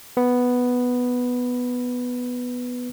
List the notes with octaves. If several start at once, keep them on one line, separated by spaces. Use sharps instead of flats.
B3 B4